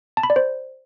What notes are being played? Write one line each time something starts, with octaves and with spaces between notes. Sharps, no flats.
A5
B5
D5
C5